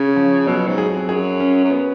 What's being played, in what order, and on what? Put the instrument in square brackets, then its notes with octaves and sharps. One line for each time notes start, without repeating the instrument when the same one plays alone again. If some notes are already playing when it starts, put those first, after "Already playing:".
Already playing: [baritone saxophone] C#3 [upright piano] C#4
[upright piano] F3
[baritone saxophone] B2 [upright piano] F#3
[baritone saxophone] G#2
[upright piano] G#4
[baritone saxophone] F2
[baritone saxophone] F#2 [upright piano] G#4
[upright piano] C#4
[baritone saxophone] F#2
[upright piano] B3